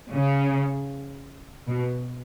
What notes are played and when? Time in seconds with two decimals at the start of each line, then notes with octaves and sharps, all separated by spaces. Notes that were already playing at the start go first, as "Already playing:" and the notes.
0.13 C#3
1.68 B2